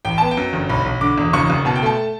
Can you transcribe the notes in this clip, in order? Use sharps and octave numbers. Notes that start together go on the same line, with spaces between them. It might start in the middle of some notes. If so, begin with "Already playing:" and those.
A1 G5
B3 A5
G5
F#2
G1
B1 B5
B1
D3 D6
E1
F#1 C#6
F#1
B2 A5
G5
A3 A5